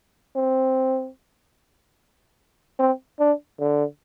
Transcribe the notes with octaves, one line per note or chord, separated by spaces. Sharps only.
C4
C4
D4
D3